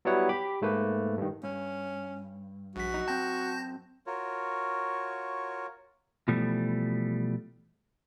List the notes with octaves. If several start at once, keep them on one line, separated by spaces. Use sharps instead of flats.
F#3 G3 B3 E4 C#5 F#5
G4 B5 D6
G#2 A3 A#3 B4
G2 D#3
G2 C#4
A#1 F#4 B6
F#2 D#4
F#2 C4 G5 A5 G6 A#6
F4 F#4 A#4 C#5
B2 E3 F3 G3 A3